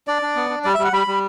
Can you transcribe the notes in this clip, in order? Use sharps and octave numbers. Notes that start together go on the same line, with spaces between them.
D4 D5
D4
B3
D4
G3 D5
E5
G3
F#5
G3 B5
G3